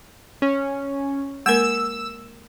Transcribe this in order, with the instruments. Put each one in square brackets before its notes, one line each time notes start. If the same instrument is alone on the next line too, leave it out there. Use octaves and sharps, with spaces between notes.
[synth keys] C#4
[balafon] G#3 A#3 A#4 [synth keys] E6 E7